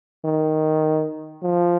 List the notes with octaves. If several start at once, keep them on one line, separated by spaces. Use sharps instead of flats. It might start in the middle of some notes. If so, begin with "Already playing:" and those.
D#3
F3